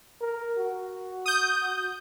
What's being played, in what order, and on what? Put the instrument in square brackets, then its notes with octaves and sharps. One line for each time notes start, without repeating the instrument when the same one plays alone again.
[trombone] A#4
F#4
[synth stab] D#6 G6